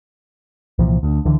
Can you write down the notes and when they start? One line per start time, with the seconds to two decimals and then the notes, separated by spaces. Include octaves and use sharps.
0.79 C2 A#2 E3 F3
1.03 D2
1.25 C#2 D3 E3